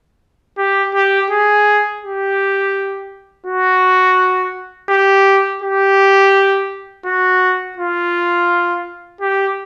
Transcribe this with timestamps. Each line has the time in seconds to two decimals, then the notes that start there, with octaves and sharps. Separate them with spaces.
0.58 G4
0.95 G4
1.30 G#4
2.02 G4
3.46 F#4
4.90 G4
5.62 G4
7.05 F#4
7.77 F4
9.21 G4